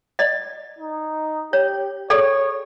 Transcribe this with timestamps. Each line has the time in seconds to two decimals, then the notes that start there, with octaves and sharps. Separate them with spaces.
0.19 D5 D#5
0.79 D#4
1.53 G4 C#5
2.10 G#4 A4 C#5 D5